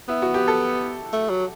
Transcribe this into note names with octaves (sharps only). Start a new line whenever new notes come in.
B3 E4
F#4
G4
A4
A3
F#3